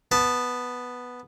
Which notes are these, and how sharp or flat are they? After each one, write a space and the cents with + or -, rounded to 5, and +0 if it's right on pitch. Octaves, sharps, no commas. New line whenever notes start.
B3 +0 A5 +0